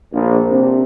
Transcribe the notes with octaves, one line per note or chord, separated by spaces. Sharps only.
A#1
C3